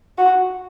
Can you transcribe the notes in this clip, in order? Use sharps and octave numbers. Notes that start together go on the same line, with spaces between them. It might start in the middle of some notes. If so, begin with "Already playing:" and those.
F#4